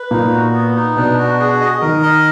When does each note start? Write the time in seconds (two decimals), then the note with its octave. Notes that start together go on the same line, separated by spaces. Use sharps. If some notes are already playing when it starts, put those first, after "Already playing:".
Already playing: B4
0.11 A#2 A#3 D#4
0.33 F#4
0.53 B3
0.76 D#4
0.96 B2 B3 D4
1.18 F#4
1.40 G#4
1.61 D#5
1.81 D#3 D#4 A#4
2.03 D#5